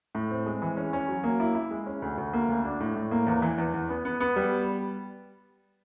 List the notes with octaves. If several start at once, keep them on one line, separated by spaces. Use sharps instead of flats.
A2
C4
G#3
E3
C#4
C#4
F#3
A#3
E4
E4
G#3
C#4
D2
D2
A#3
D2
D4
A2
A2
A#3
E2
E3
E2
E2
B3
B3
B3
G3